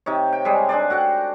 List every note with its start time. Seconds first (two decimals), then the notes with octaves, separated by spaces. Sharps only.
0.06 C3 D#4 C#5
0.33 G5
0.45 G3 G#3 G#4
0.69 D4 G#4 C5 D5
0.90 F#4 A4 F#5 G5